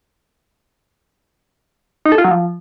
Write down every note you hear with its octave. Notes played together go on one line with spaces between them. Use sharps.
D#4
A4
F4
F#3
F3